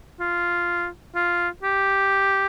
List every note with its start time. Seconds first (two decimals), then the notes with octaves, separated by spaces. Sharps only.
0.20 F4
1.15 F4
1.63 G4